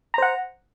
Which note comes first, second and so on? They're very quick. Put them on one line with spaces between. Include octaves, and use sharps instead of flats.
A#5 C5 F#5